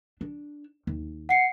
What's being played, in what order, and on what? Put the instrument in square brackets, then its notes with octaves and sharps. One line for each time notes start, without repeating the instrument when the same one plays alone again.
[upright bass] D4
D#2
[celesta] F#5 C7 C#7